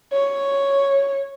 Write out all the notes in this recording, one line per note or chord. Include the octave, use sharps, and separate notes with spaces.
C#5